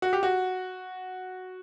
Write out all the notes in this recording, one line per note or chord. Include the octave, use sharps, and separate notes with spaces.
F#4
G4
F#4